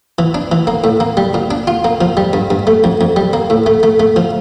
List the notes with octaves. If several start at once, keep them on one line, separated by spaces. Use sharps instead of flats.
E3
D4
E3
A#3
A2
A#3
G3
A#2
D4
F4
A#3
F3
G3
G2
G2
A3
F2
F2
G3
A#3
A2
A3
A3
A3
F3